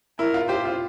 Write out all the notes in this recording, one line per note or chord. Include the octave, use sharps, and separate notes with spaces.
E4 A#4
F4
G4 C5
F4